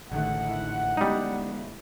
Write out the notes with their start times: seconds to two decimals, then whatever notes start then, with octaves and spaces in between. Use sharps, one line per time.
0.12 A1 G#2 D3 D#3 A3 F#5
0.49 E4
0.97 G3 G#3 B3 D#4